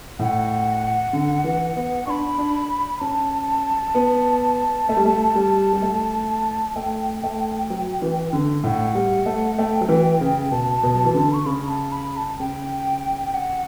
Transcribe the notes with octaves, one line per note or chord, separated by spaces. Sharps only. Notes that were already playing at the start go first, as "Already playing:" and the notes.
A2 F#5
D3
E3
B3
D4 B5 C#6
D4
C#4 A5
B3
A3
G3
A3
G3
G3
A3
A3 G5
A3
F#3
E3
D3
A2 F#5
G3
A3
A3 G5
F#3
E3
C#3
B2 A5
B2
F#3
E3
D3
C#6
C#3 B5
A5
B5
A5
C#3 G5
F#5